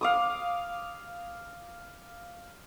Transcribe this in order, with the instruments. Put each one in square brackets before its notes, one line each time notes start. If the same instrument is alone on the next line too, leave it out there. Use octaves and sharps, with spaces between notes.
[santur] F5 D6 D#6